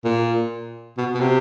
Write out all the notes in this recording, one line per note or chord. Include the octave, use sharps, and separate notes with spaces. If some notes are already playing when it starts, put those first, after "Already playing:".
A#2
B2
B2
C3